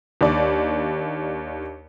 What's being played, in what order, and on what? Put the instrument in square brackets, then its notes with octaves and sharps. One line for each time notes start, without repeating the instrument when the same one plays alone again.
[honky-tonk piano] D#2 D4 D5